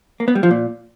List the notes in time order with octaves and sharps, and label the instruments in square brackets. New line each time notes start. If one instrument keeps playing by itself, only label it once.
[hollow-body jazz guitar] A#3
B3
G3
F3
A#2